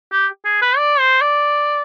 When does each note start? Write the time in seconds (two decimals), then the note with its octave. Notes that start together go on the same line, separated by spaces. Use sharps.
0.12 G4
0.45 G#4
0.61 B4
0.77 D5
0.99 C5
1.21 D5